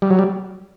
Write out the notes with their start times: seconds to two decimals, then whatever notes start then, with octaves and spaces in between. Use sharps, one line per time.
0.02 G3
0.10 F#3
0.19 G3